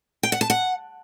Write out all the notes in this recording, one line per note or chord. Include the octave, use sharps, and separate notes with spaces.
G5
F#5
A5
F#5